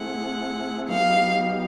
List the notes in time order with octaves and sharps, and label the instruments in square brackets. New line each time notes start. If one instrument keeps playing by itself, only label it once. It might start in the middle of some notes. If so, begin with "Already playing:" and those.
Already playing: [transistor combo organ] A3 C4 E4 G#4 [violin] F#5
[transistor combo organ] F#3 B3 D#4 G4 [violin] F5